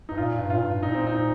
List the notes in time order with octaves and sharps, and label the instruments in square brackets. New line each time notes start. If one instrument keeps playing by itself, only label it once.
[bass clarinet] G2 [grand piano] D#4
[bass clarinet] A#2 [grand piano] F4
[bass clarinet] G2
[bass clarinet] A#2 [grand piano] F4
[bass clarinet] G2
[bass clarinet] A#2 [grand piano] D#4
[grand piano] C4
D#4